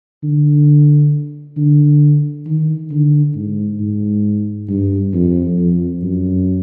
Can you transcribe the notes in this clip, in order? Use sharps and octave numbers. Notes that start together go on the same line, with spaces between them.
D3
D3
D#3
D3
G#2
G#2
G2
F2
F2
F#2